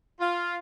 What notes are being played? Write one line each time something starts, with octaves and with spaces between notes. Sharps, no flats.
F4